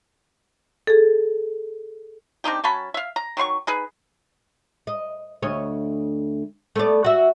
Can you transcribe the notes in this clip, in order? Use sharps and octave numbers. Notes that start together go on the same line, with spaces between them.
G#4 A4
C4 D4 D#4 G4
F#3 C#4 A5 B5
E5 F5
A#5
D#3 F#3 C6 C#6
D#4 G#4 B4
D#5
D2 C#5 D#5
A3 B3 D5
F#4 E5